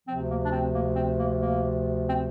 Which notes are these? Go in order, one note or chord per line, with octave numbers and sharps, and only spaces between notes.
D2 C3 F3 C4
A#3
D4
C4
A#3
C4
A#3
A#3
C4